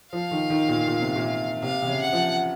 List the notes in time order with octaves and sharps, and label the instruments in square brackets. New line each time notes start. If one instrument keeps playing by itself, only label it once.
[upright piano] F3 [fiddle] F5
[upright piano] D#3
D#3
A#2
A#2
C3
A#2
[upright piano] C3 [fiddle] F5
[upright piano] C3
C#3
[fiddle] F#5
[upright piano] F3